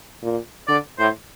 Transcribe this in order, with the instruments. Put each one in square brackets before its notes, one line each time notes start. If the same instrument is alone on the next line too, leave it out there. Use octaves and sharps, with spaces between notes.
[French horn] A#2
[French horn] D3 [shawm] D5
[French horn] A2 [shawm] C5